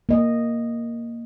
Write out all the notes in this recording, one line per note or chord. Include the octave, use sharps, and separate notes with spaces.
A#3 D#5